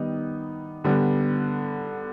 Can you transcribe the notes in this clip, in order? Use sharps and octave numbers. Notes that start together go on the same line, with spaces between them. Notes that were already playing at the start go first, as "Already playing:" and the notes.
Already playing: D#3 G3 B3 D#4
D3 G3 B3